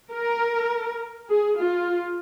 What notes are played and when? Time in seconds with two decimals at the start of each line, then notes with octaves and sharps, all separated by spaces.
0.11 A#4
1.29 G#4
1.59 F4